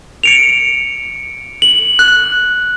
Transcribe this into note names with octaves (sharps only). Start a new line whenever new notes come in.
C#7 D7 F7
F#7
F#6